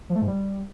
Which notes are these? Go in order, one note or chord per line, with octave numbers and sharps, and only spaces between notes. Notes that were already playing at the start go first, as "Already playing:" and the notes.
F3
A3
G#2
G3